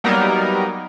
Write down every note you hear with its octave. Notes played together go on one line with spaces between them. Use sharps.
F#3 G3 A#3 B3 D#4 A#4